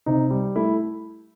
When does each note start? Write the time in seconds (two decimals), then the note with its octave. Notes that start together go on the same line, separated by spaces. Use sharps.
0.06 C3 D#4
0.30 G3
0.56 A3 E4